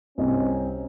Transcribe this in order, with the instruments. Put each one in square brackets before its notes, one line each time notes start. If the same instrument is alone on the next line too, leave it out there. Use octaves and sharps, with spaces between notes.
[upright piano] C2 D#5 [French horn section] C4 C#4